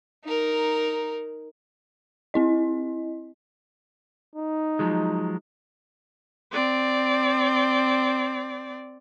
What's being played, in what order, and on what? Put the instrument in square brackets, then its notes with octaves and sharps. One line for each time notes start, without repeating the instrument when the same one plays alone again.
[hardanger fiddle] D#4 A#4
[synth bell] C4 E4 D#5
[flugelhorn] D#4
[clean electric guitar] F3 F#3 G#3
[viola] C4 D5